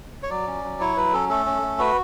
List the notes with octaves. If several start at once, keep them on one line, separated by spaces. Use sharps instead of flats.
C#5
F#3 D5
C#4
F#3
E4 C#5
F#3 B4
C#4 A4
A3 A4
C#4
A3
F#4 B4